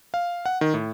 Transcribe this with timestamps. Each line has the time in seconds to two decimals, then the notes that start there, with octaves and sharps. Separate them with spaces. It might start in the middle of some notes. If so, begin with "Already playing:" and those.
0.14 F5
0.46 F#5
0.61 D#3
0.74 A2